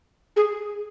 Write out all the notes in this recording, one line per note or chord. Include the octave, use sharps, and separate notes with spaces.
G#4